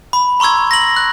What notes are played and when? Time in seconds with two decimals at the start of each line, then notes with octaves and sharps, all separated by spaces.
0.13 B5
0.40 A#5 C6 C#6 E6 G#6
0.71 A#6 F#7
0.96 F#6